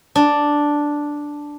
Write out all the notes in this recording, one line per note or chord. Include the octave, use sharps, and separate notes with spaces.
D4